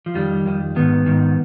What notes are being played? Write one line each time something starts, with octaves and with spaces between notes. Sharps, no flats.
F3
F2 D#3 G3
F2 D#3
G#2 D#3 B3
G#2 D#3